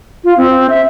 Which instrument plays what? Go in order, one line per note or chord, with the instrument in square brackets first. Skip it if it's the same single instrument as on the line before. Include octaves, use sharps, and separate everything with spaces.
[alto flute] F4
C4
E5